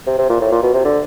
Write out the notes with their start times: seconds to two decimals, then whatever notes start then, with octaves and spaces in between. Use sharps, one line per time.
0.07 C3
0.18 C3
0.29 A#2
0.41 A2
0.52 A#2
0.63 B2
0.74 C3
0.84 D3